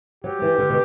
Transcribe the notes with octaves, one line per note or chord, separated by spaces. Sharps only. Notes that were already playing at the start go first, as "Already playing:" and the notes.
F#3 G4
E3
D3
B2